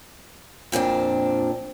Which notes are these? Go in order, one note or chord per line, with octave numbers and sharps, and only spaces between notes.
F2 A#2 C4 D4